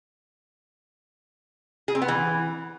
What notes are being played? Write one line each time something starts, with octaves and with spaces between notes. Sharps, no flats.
G#4
C4
B3
E3